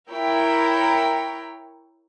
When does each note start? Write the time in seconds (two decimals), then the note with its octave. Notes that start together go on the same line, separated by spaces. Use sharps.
0.11 E4 A#4 C#5 G5